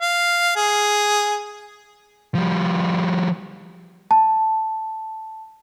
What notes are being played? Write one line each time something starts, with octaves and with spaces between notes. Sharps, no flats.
F5
G#4
F3 G3
A5